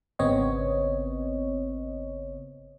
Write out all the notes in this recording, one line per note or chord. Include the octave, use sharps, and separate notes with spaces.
G#1 C#3 B3 C4 C#5 D#5